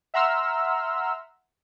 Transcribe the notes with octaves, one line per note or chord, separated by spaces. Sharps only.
E5 F#5 A#5 C6 E6 F6